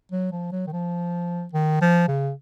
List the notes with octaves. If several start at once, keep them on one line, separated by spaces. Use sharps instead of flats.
F#3
F3
F#3
D#3
F3
D#3
F3
C#3